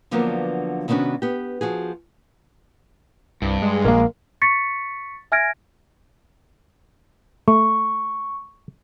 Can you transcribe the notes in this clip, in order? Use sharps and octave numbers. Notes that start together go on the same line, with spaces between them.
D3 F3 F#3 A#3 B3 D4
C3 D#3 B3 C#4 D4 F#4
B3 G4
F3 F#4 G#4
C2 G2
G#3
A#1 A#3 A#4 F5
C#6 A6 B6 C#7
E5 G#5 F6 G#6 A#6 D7
A3 C#6